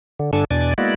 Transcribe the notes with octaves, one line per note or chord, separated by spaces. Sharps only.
D3
G2 D3 D4 A4 G#5 A5
E2 B2 D4 D5 G#5 A6
G#3 A#3 B3 E4 F#4 D5